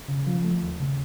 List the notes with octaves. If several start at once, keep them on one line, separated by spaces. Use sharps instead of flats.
C#3
F3
A3
D#2
C#3